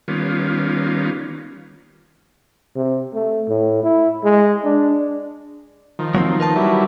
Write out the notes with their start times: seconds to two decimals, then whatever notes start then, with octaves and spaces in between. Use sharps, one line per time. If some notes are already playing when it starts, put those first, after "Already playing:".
0.08 D#3 G3 A#3 B3 C#4 F4
2.76 C3
3.14 A3
3.49 A2
3.83 E4
4.24 G#3
4.64 D4
5.99 D#3 F3
6.15 F#3 A#3 C4
6.40 A#4 B4 A5
6.56 F#3 G3 E4